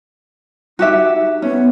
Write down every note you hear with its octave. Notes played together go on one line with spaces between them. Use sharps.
D#4 F#4 G4 E5
B3 C#4